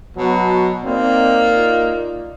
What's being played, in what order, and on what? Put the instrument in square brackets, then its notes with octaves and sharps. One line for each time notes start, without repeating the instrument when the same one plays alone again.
[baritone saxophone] B2 [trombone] F#3
[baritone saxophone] A#3 [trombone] C4 [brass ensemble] D#4 D5 D#5
[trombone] F4